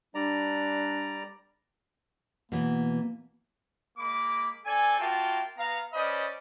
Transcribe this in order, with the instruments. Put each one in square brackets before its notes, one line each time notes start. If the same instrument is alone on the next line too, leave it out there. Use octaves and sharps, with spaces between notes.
[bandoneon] G3 D5 A#5 [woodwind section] D4
[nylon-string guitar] B2 E3 [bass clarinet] A#3
[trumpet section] G#3 A#3 B5 D6
C4 A4 D5 G#5
A#3 F4 F#4 E5 G5 A5
B3 F5 A#5
C#4 B4 C5 D5 D#5 B5